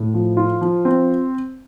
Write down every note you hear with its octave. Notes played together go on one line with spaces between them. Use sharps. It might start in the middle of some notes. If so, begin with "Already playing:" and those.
Already playing: A2
F3
F4
F3
C4